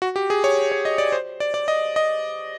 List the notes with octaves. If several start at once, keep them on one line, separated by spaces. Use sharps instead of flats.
F#4
G4
G#4
C#5
C#5
D#5
D5
C5
D5
D5
D#5
D#5